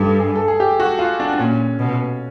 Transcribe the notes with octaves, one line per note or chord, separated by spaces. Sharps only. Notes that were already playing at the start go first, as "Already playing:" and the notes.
Already playing: G2 A4
G#4
A4
G#4
G4
F#4
F4
D4
D4
A#2 C#4
B2